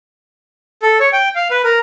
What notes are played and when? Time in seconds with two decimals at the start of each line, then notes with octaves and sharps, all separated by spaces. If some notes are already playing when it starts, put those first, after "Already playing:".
0.82 A4
1.00 C#5
1.13 G5
1.35 F5
1.51 B4
1.64 A#4